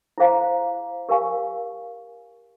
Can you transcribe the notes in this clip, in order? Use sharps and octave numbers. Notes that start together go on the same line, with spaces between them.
E4 G#4 C5 F5 A#5
G4 A#4 F5 G#5 C#6